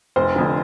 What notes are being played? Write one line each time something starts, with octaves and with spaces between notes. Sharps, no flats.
F1 C5
F2 D3